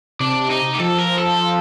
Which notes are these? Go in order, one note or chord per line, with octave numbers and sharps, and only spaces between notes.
C3 D4
D#4
G4
F3 A4
A#4
A4